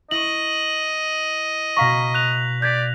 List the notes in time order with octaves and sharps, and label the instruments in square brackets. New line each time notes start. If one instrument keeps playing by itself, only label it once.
[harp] E4 C#6 [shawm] D#5 [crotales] F#7
[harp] B2 F5 A#5 [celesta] C#6 [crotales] A#6 B6
[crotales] F#6 F7
[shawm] D5 [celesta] G6 G#6 B6